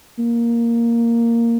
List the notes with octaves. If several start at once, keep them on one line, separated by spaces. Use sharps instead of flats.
A#3